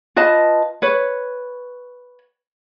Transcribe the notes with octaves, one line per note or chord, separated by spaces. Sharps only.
F4 B4 D#5 A5
B4 C#5